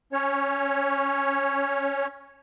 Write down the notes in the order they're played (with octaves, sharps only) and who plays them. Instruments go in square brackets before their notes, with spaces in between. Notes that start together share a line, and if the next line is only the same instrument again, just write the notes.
[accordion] C#4 C#5